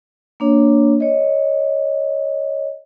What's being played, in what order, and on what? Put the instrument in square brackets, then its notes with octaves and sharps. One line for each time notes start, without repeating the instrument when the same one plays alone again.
[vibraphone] A#3 D4 C#5
C#5 D#5